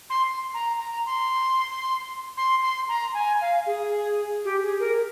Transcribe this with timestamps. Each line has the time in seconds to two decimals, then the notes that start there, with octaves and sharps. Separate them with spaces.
0.10 C6
0.54 A#5
0.80 A#5
1.06 C6
2.37 C6
2.62 C6
2.88 A#5
3.14 G#5
3.41 F5
3.66 G#4
4.45 G4
4.62 G#4
4.80 A#4